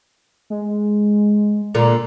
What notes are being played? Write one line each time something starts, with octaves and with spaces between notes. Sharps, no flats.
G#3
A#2 D3 A#3